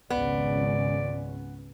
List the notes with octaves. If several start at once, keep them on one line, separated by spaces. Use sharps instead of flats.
G#1 C#2 B3 C#4 D5